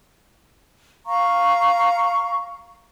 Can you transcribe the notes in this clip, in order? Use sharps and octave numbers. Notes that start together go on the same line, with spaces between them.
F5 A#5 C#6